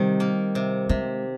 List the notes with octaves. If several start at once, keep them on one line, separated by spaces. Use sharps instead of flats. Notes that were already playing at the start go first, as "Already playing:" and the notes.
Already playing: C3 D#3 G3
A#3
C3
C3 G#3